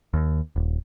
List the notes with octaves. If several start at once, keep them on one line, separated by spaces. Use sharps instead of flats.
D#2
D#1